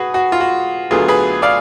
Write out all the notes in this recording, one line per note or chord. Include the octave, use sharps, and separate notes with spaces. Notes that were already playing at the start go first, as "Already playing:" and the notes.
Already playing: F#4 G#4 B4
F#4
F4
F#4
D2 D3 F#3 B3 F4 G#4
G#4 B4
D5 F5